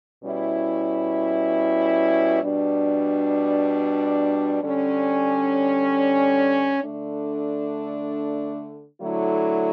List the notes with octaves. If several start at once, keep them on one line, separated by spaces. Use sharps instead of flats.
B2 G3 C#4 E4
B2 G3 D4
D3 G3 C#4
D3 A3 D4
D3 F#3 A3 E4